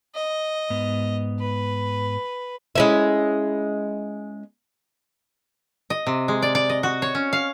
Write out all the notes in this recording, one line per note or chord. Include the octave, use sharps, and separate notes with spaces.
D#5
G#2 B3
B4
G#3 C#4 E4
D#5
C3
G#3
D5
D5
D#5
F#4
C#5
C#4
F5